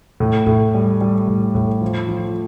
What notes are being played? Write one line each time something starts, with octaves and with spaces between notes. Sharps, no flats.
A2
A2
G3
G3
A2
A2
F3
F3